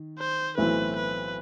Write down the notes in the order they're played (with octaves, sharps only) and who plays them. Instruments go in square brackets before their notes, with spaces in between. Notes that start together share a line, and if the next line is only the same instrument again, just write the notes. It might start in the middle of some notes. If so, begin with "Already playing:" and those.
Already playing: [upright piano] D#3
[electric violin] C5
[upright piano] B1 A2 E3 A3 C4 [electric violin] B4
[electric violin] B4